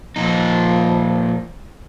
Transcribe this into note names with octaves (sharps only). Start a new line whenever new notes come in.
A#2 F3 D#4